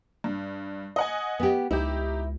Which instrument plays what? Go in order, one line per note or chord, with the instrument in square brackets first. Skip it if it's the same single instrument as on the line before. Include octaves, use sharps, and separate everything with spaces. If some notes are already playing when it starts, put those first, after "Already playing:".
[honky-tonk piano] G2
D#5 F#5 G#5
[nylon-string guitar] B3 G4
[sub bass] C#2 [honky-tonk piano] D#4 G4 [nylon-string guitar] E4